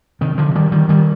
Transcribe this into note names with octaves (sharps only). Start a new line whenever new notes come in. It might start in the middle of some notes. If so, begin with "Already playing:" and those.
C3 D#3
D3 F3
D#3 G3
D#3 G3
D#3 G3